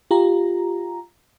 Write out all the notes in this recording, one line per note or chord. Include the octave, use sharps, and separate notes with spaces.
F4 G4 A#5